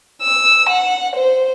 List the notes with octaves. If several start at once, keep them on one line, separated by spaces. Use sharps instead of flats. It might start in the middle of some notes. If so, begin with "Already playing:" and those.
E6
F#5
C5